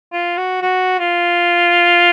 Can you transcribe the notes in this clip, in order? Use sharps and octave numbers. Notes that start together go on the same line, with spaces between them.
F4
F#4
F#4
F4